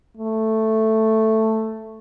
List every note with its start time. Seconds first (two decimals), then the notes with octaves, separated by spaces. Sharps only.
0.17 A3